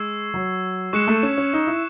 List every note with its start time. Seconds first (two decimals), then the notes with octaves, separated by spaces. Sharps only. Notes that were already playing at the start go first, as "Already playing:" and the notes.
Already playing: G#3 C#6 E6 G#6 C7
0.34 F#3
0.93 G#3 C#6 F#6 C#7 E7
1.07 A3
1.23 C#4
1.37 C#4
1.53 D#4
1.67 E4